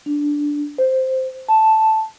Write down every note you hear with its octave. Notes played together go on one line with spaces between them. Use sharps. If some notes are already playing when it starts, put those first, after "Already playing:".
D4
C5
A5